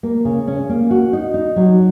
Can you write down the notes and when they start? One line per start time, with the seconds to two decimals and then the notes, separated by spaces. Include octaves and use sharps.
0.03 A#3
0.25 C#3
0.47 C#4
0.69 A#3
0.91 F#4
1.13 D#4
1.34 D#4
1.56 F#3